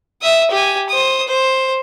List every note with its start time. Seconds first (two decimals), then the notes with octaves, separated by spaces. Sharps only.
0.22 E5 D#6
0.51 G4 G#5
0.89 C5 D#6
1.27 C5